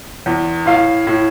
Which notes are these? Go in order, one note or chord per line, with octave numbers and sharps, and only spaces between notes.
E2
A2 F5
A2